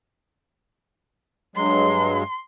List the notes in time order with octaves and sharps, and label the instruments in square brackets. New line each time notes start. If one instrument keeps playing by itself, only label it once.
[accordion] G2 F#3 G#3 [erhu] C6